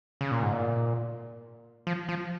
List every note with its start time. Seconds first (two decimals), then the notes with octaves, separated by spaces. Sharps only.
0.21 C#3
0.31 A#2
0.42 G#2
0.53 A#2
1.87 F3
2.09 F3